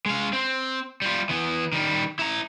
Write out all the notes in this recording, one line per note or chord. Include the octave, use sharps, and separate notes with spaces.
G#3 F5
C4
G3 F4
E3 B3
D#3 G3
E4 A#5